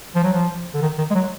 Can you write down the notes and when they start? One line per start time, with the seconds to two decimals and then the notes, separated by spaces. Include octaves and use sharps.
0.15 F3
0.24 F#3
0.33 F3
0.74 D3
0.82 D#3
0.98 D#3
1.11 G#3
1.15 F#3